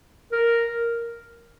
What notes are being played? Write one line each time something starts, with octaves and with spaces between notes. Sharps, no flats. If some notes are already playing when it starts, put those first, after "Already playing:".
A#4